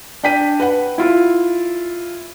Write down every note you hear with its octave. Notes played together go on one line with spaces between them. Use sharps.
D4 G5 B6 D#7
B4 F#5
E4 F4